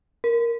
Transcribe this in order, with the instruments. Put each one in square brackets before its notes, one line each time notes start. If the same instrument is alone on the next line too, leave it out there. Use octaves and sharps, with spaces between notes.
[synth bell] A#4